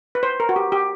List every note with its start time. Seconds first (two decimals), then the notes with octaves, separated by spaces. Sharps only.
0.15 B4
0.23 C5
0.40 A#4
0.49 F#4
0.56 G4
0.72 G4